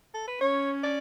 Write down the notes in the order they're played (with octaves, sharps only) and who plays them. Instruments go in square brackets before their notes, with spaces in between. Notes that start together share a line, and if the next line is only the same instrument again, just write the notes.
[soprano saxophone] A4
B4
[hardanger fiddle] C#4 [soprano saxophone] C#5
[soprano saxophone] D5